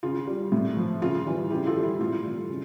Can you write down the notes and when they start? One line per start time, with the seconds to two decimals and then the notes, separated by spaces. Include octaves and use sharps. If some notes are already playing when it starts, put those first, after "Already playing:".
0.03 C#3 F4
0.27 G3
0.52 A2
0.77 F3
1.02 C#3 F4
1.26 E3 G3
1.50 C#3 E4 G4
1.67 F4 A4
1.76 E3 G3
1.83 E4 G4
2.00 A2 F4
2.24 E3 G3
2.49 C#3